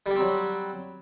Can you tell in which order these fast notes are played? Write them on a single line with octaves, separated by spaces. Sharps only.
G3 G4 C4 F#3